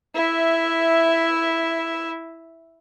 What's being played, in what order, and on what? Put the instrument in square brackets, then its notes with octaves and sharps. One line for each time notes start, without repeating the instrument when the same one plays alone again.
[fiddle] E4 E5